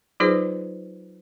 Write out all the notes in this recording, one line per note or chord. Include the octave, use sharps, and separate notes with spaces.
F#3 D#4 F4 G#4 B4 C5